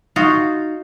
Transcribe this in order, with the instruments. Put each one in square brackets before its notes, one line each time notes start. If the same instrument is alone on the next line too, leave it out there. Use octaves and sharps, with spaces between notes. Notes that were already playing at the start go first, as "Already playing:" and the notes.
[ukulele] D#4 [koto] F4 F#4